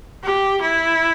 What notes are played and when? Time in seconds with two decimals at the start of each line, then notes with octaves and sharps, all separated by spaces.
0.23 G4
0.62 E4